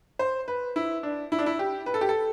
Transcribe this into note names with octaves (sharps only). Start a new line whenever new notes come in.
C5
B4
E4
D4
E4
D4
E4
G4
B4
A4
G4
A4